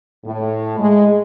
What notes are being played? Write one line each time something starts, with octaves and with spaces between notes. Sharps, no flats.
A2
G#3